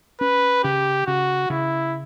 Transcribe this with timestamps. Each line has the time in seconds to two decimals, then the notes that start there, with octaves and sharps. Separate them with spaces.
0.21 C#4 B4
0.64 C#3 G4
1.07 C#3 F#4
1.50 C#3 E4